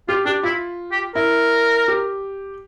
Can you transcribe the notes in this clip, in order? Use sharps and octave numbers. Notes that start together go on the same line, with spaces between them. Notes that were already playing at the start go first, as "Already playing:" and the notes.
F4 G4
D4 G4
E4 F4
G4
E4 A#4
G4